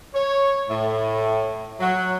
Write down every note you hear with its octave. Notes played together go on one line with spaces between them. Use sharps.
C#5
A2
F#3